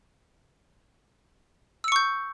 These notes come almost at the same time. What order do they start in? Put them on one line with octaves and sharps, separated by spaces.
E6 C#7 C#6 G6